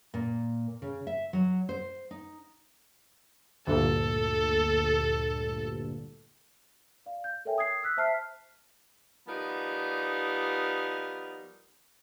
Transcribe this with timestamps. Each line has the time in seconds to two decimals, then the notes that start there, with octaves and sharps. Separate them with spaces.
0.14 A#2
0.82 C#3
1.07 E5
1.33 F#3
1.69 C5
2.11 D#4
3.67 D2 G2 A#2 A4
7.06 D5 F5
7.24 G6
7.45 A4 A#4 C#5 E5 G5 G#5
7.58 D#6 G#6 C7
7.83 E6 F#6 B6
7.97 C5 E5 A5 F6 B6 C7
9.28 F3 G3 B3 D#4 A#4